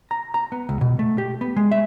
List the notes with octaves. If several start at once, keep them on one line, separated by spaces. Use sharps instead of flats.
A#5
A#5
B3
C#2
B2
A3
G4
B3
G#3
E5